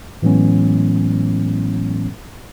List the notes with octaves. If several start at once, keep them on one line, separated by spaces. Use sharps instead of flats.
A2 E3 F#3 G#3 B3 C#4